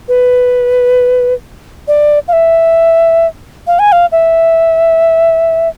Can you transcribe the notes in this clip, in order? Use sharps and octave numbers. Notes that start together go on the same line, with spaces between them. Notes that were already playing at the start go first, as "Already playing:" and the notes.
B4
D5
F5
E5
F5
G#5
F5
E5